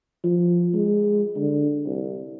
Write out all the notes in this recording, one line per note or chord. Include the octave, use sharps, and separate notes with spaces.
F3
G#3
D3
C2